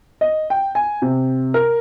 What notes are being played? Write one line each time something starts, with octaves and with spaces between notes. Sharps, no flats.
D#5
G5
G#5
C3
A#4